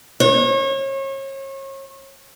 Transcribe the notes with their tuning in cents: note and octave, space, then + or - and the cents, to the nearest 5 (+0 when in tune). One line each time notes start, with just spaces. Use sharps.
C#5 -35